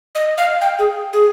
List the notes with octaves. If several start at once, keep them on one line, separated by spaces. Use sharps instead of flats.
D#5
F5
G5
G#4
G#4